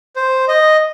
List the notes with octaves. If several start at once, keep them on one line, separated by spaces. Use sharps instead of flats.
C5
D#5